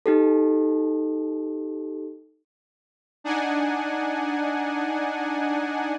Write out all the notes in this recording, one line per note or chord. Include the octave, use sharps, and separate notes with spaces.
D#4 G4 A4
D4 D#4 F#5 G#5